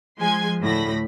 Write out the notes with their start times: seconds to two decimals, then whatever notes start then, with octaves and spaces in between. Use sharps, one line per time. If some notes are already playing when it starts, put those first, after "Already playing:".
0.18 F3 G#3 G#5 C6 G#6
0.60 D2 A2 D3 B5 A#6